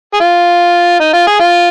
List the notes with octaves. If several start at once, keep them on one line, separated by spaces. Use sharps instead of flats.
G#4
F4
D#4
F4
G#4
F4